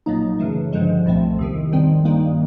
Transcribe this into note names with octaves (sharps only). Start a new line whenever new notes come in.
A#1 A#2 F#3 A#3 D#4
F#2 C#3 E3 A3
G1 G2 D3 F3 G#3
C2 A#2 F3 A3 C4
E2 C3 D#3
A#1 G#2 D#3 G3 C4
G2 D#3 G3 A#3 D#4